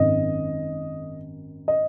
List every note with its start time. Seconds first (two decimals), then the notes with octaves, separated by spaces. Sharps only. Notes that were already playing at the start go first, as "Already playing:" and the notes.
Already playing: G#1 F#2 D#3 D#5
1.68 D#5